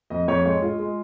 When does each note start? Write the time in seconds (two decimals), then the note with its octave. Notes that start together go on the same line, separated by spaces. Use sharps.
0.10 F2 D#5
0.28 F2 C#5
0.46 G#3 C#5
0.62 G#3 F4
0.79 G#3